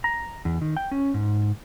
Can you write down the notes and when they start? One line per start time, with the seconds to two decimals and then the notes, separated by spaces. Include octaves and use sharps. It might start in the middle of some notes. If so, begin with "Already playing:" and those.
0.04 A#5
0.45 E2
0.61 D#3
0.77 G5
0.91 C#4
1.14 G#2